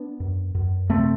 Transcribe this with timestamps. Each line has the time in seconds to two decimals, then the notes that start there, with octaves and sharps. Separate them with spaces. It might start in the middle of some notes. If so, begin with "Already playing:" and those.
Already playing: B3 D4
0.20 F#2
0.55 F#2
0.90 C3 A3 C4